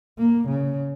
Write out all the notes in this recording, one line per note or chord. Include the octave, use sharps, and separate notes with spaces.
A#3
C#3